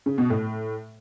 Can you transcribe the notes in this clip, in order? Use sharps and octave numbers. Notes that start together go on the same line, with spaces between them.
C#3
B2
A2